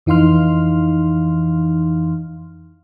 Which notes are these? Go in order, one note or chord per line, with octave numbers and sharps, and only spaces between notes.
F2 E3 D#4 F5 C6 F6